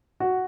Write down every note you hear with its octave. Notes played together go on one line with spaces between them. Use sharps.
F#4